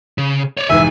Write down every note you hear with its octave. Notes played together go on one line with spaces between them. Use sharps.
C#3
C#5 D5
F1 G#2 E3 E5 G#5